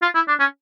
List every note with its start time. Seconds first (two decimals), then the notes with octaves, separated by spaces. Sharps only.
0.02 F4
0.15 E4
0.28 D4
0.40 C#4